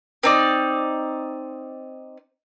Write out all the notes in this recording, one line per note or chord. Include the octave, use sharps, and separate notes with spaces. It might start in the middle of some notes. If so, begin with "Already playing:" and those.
C4 D#4 D5